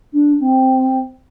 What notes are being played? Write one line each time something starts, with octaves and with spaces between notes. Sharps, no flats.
D4
C4